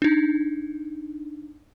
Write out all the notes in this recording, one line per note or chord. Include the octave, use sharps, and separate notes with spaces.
D4 D#4